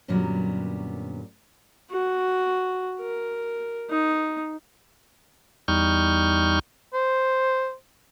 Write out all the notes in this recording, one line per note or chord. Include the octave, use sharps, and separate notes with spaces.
F#2 A#2 D3 F#3 G3 B3
F#4
A#4
D#4
E2 G3 D#4 C#6 F6 G6
C5